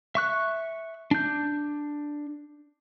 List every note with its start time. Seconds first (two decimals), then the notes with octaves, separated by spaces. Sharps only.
0.15 E5 C#6 F#6
1.11 D4 G6